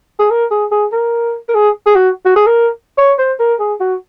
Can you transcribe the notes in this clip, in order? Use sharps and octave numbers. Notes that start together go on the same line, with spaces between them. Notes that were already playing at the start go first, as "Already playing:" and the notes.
G#4
A#4
G#4
G#4
A#4
A#4
G#4
G#4
F#4
F#4
G#4
A#4
C#5
C5
A#4
G#4
F#4